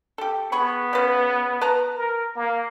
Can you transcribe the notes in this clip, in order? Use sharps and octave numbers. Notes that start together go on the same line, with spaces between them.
G4 A4
B3 G#4 B5 C#6
C#3 B4
B4 A5 A#5
A#4
A#3